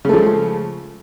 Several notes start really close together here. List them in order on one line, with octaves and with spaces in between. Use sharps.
C#3 A3 F3 G#3